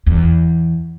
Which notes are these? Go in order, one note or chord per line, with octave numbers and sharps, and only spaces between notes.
E2